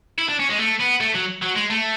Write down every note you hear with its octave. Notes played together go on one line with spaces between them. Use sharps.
E4
D4
C#4
G#3
A3
B3
A3
F#3
F#3
G#3
A3